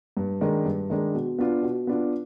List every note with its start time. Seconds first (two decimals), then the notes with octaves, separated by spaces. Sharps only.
0.17 G2
0.41 D#3 G#3 D4
0.65 G2
0.90 D#3 G#3 D4
1.14 B2
1.39 B3 D4 F4
1.63 B2
1.87 B3 D4 F4